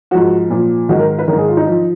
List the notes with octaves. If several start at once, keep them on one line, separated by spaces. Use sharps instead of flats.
G#2 F3 F#4
A#2 F3
G#2 D#3 F#4
A#4
B4
D#3 A#4
G#2 G#4
F4
D#4
F3